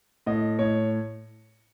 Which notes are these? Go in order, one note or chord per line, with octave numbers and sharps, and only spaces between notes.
A2 D#5
A2 C#5